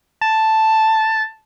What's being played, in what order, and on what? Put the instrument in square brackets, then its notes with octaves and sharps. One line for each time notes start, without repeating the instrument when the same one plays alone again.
[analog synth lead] A5